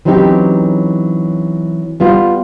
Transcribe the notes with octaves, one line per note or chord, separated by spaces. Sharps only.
E3 F#3 C4 C#4 D#4 G4
G3 B3 F4